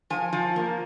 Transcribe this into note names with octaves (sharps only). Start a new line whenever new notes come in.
F3 G#5
F3
A#3